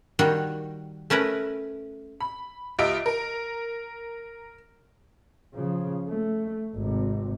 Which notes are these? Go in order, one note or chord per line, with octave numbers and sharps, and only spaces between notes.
D#3 G3 F#4 G5
A3 C#4 A#4 B4
B5
C#2 F4 G4 D#5 E5 D7
A#4
C#3 F3
A3
G#1 C3